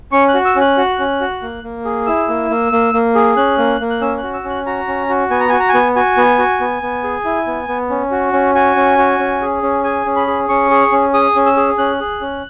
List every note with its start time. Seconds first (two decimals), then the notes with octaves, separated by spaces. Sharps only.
0.12 C#4 C#6
0.29 F#6
0.34 F#4
0.45 E6
0.56 C#4
0.61 F#6
0.78 F#4
0.99 C#4
1.21 F#4
1.42 A#3
1.64 A#3
1.85 G#4
2.06 E4 E6
2.28 A#3
2.50 A#3
2.72 A#3
2.93 A#3
3.15 G#4
3.37 C#4 F#6
3.58 A#3
3.80 A#3
3.90 F#6
4.01 C#4 E6
4.18 F#6
4.23 F#4
4.34 E6
4.44 C#4
4.50 F#6
4.66 F#4 A#5
4.88 C#4
5.09 F#4
5.30 B3 G#5
5.40 A#5
5.49 F#4 G#5
5.60 A#5
5.69 G#5
5.74 B3
5.96 F#4 G#5
6.17 B3
6.39 F#4
6.60 B3
6.82 B3
7.04 G#4
7.25 E4
7.47 B3
7.68 B3
7.90 C#4
8.11 F#4
8.33 C#4
8.55 F#4 G#5
8.76 C#4
8.98 F#4
9.19 C#4
9.41 G#4
9.63 C#4
9.84 G#4 G#5
10.06 C#4
10.16 B5
10.27 G#4
10.49 C#4 C#6
10.70 G#4
10.92 C#4
11.14 G#4 D#6
11.36 C#4
11.46 E6
11.57 G#4
11.78 C#4 F#6
12.00 G#4
12.21 C#4